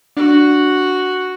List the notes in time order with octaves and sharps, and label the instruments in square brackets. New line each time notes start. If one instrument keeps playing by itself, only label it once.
[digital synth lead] D4 [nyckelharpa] F#4